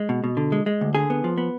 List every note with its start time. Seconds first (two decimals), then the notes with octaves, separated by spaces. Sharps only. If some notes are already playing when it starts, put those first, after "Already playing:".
Already playing: G#3
0.09 B2
0.24 B2
0.37 D3
0.52 G#3
0.66 G#3
0.81 D2
0.95 D3 G#4
1.10 B3
1.24 F3
1.38 B3